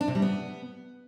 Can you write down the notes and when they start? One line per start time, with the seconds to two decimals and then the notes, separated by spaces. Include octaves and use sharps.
0.01 D4
0.08 C3
0.15 G3
0.22 B3